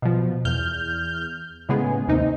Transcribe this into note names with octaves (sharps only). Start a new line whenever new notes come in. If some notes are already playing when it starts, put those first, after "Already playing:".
B2 F3
E2 F6 G6
A2 C#3 G#3 B3 G#4
D#2 C3 D#4